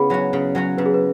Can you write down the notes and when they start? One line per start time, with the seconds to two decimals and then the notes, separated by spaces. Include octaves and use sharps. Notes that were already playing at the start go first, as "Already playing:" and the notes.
Already playing: C#3 B3 E4 G#4
0.10 F#3 C#4 F#4
0.33 C#3
0.55 F#3 C#4 F#4
0.78 C#3 B4
0.86 G#4
0.94 B4